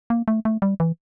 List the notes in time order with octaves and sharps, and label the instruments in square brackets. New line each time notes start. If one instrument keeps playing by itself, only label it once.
[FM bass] A#3
A3
A3
G3
E3